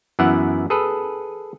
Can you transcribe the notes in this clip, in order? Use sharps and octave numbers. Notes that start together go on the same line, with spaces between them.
F#2 E3 B3 E4 F#5
G#4 A4 B4